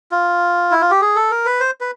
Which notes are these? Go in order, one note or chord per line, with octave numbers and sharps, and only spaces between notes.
F4
E4
F4
G4
G#4
A4
A#4
B4
C5
B4